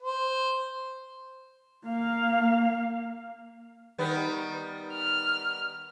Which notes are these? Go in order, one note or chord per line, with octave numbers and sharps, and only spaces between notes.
C5
A#3 F5
D#3 G3 B3
F6